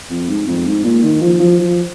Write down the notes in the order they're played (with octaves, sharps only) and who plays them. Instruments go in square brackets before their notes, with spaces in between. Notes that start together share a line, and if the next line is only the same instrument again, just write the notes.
[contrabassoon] F2
G#2
F2
G#2
A#2
D#3
F3
F3
F3